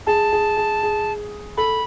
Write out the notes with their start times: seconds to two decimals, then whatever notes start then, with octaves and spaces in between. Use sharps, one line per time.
0.07 G#4 A5
0.32 G#4
0.57 G#4
0.83 G#4
1.57 A4 B5